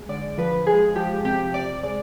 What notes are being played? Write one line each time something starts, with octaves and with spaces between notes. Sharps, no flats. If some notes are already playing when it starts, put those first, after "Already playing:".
Already playing: G#3
D3 D5
F3 B4
G#3 G#4
F3 G4
C3 G4
C3 D5
G#3 D5